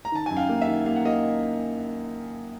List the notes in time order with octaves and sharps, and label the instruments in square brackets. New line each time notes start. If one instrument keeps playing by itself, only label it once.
[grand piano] A#5
D#3 A5
F#2 G#5
F5 G5
A#3
E5 F#5
D#3
A#3 F5
F#5
A#3 D#5 F5